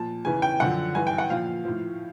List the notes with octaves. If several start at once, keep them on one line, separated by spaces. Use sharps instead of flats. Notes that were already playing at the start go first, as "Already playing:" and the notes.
Already playing: A#2 F3 A5
E2 C#3 E3 G#5
G5
F#2 D3 F3 F#5
G2 E3 G#5
G5
F#5
A#2 F3 F5
A2 F3